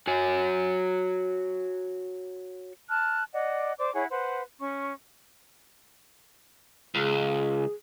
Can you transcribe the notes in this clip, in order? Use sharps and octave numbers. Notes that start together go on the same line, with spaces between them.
F#4 C#5 G#5
A5 F6 F#6
D5 D#5 F#5
C5 D5 D6
E4 G#4 C#5 F#5
B4 C5 F#5
C#4 C#6
C#2 G#4